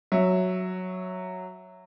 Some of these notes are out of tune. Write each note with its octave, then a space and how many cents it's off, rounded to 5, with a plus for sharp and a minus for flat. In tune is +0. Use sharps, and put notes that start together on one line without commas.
F#3 -5 E5 +0